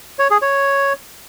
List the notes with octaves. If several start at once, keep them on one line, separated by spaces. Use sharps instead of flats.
C#5
G#4
C#5